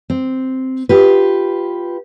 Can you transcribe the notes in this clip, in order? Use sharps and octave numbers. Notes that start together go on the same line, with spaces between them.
C4
F4 G4 B4